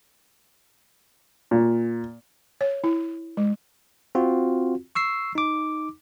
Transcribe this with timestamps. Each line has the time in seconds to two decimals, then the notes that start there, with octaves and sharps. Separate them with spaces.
1.51 A#2
2.61 C#5
2.84 E4
3.37 G#3
4.15 C4 F4 F#4
4.95 C#6 E6 C7
5.35 D#4 D6